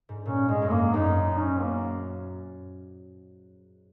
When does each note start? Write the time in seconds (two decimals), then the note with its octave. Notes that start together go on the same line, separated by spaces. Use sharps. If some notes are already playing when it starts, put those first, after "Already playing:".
0.09 G#2
0.25 A#2 C#4
0.48 G#2 G#3
0.62 F#2
0.71 G#2 A#3
0.94 F#2 D#4
1.17 D#4
1.40 C#4
1.61 A#3